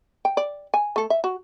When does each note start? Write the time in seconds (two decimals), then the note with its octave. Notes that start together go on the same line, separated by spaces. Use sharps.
0.25 G5
0.37 D5
0.74 G#5
0.96 A3 A4
1.10 E5
1.24 F#4